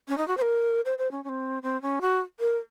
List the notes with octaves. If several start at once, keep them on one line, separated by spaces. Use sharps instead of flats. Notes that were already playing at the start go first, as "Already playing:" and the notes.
C#4
D#4
F#4
C5
A#4
C5
C5
C#4
C#4
C4
C4
C#4
F#4
A#4